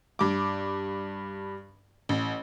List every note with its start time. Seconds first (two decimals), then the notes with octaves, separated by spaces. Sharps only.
0.19 G2 D6
2.09 A1